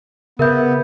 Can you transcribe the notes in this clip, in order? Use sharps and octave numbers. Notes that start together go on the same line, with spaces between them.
C#3 B3 A#4 E5 G6